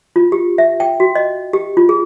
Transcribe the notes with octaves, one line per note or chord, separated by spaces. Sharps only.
F4
G4
E5
G5
F#4
D#5
G4
F4
G#4